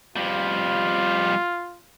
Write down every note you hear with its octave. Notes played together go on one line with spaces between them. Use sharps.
F2 G3 F4